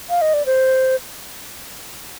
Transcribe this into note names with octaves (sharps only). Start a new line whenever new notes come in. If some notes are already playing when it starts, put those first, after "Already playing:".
F5
D#5
D5
C5